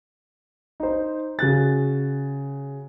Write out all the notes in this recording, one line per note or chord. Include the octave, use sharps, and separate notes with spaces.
D#4 C5
C#3 F#4 F#6 A6